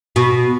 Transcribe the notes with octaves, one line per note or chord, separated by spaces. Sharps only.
B2